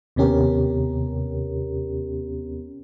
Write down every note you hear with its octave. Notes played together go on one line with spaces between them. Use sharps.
D#2 C3 B3 C#4 G4 A#4